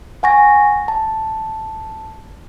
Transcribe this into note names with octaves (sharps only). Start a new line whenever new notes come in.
F#5 G#5 C#6 A#6
A5